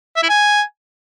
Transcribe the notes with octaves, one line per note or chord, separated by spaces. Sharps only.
E5
E4
G#5